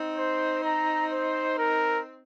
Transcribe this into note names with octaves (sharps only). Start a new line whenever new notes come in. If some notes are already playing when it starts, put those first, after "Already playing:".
Already playing: C4 D#4
C5
A#5
C5
A#4